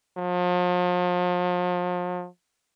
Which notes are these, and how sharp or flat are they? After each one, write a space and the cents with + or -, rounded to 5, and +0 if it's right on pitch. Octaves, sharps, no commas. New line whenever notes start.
F3 +40